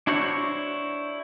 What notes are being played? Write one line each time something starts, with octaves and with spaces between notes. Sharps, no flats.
D4 E4 F#4 C5 C#5